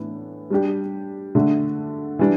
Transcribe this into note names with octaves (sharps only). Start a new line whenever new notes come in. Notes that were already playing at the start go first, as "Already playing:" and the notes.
Already playing: A2 E3 B3 D4
G3 D4 G4
D3 A3 D4
E3 G3 D4